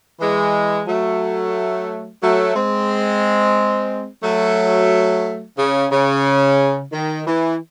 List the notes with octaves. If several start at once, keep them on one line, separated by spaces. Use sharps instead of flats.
E3 G#3
F#3 A3
F#3 A3
G#3 C4
F#3 A3
C#3
C#3
D#3
E3